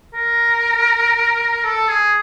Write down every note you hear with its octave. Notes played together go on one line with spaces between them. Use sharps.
A#4
A4
G#4